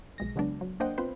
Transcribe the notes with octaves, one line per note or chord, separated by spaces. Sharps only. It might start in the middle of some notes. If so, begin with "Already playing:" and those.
B1 G#3 A#6
C#3 F#3 G#3 B3 D4
F#3
A#3 D4 C5 D#5 F#5 G5
B3 C4 F4 B4 C5